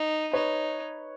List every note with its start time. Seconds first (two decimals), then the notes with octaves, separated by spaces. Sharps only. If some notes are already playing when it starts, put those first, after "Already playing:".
Already playing: D#4
0.33 D#4 B4 C#5